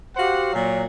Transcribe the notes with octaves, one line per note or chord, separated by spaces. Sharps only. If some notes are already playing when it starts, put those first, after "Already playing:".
F#4 G4 C5 F5 F#5
A#2 F#3